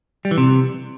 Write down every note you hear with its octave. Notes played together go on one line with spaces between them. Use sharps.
G3
E3
C3